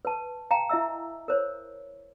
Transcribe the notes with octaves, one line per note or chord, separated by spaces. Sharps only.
B4 A5
F5 G5 A5 A#5
E4 D#5 E5 E6
A#4 C5 C#5